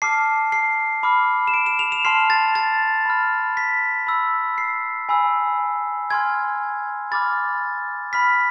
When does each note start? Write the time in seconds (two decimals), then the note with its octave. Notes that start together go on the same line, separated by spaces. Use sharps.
0.02 A5 D6 F6 C7
0.52 C7
1.03 B5 D6 F6
1.47 E7
1.54 D7
1.66 E7
1.79 F7
1.92 E7
2.05 A5 C6 F6 C7
2.30 A6
2.55 A6
3.06 B5 F6
3.57 B6
4.07 B5 E6
4.58 C7
5.09 G#5 B5 E6
6.10 G#5 C6 F6 G#6
7.11 B5 D6 F6 A6
8.13 B5 F6 B6